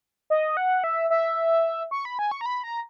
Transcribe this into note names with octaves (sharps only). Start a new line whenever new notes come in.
D#5
F#5
E5
E5
C#6
B5
G#5
C#6
A#5
B5
A#5